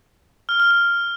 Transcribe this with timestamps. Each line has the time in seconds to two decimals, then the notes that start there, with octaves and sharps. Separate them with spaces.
0.49 F6
0.60 F6
0.71 F6